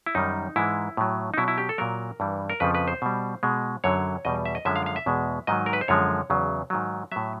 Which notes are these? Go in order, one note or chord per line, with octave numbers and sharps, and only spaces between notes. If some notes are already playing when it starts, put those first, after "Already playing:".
E4
F#2 D#3 G3 D#4
G#2 E3 G#3 E4
A2 F#3
D#4
B2 F#3 E4
E4
G4
A4
A#2 F#3 A#4
G2 E3 G3
A#4
F2 C#3 F3 B4
B4
C5
B2 G3
B2 G#3
F#2 D3 F#3 C#5
E2 B2 G3 D#5
E5
D#5
F#2 D3 F3 G#3 E5
F5
F5
E5
E2 B2 G#3
G#2 D#3 F#3 D#5
A#4
B4
C5
F#2 D3 F3 G#3 C#5
E2 C#3 F#3
G#2 D#3 F#3
A2 F#3 E5